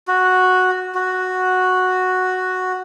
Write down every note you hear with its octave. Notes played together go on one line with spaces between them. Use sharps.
F#4
F#4